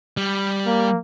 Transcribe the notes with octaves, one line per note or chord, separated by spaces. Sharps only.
G3
A#3